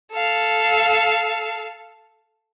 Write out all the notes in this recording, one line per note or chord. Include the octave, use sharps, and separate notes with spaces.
A4 F5